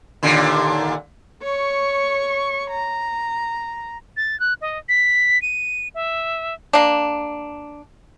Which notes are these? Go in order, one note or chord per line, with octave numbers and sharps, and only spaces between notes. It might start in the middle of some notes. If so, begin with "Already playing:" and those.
D#2 A#2 D3
C#5 C#6
A#5
A6
F#6
D#5
B6
D#7
E5
A#3 D4